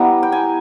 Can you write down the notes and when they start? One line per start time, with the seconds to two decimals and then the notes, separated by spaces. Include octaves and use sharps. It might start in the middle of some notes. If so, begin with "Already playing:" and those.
Already playing: G3 B3 E4 A#5
0.23 G5
0.32 G#5